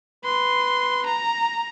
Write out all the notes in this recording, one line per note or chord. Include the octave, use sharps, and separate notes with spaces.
B4 C6
A#5